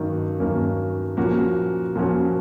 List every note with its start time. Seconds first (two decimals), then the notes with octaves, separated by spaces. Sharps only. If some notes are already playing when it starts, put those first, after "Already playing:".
Already playing: G2 D#3 F#3 A#3 C#4
0.39 G2 D#3 F#3 A#3 C#4
1.17 A#2 F3 A#3 C#4 F#4
1.96 A#2 F3 A#3 C#4 F#4